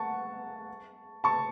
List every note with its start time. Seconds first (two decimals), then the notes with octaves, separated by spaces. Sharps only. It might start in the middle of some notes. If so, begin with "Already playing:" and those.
Already playing: F#5 A5 C#6
1.24 A5 C#6